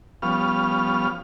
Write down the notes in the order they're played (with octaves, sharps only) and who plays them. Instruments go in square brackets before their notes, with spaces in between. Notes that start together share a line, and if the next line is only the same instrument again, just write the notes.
[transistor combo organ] F3 G3 B3 C#4 F5 F6